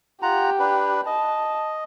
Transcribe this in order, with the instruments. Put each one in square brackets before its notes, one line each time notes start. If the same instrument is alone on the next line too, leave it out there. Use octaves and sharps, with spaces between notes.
[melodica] F4 F#5 A#5 [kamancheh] G4
[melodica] D4 B4
[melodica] D#5 [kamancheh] A5